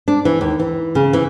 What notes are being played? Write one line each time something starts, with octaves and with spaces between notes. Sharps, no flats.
D4
E3
D#2
E3
C#3
E3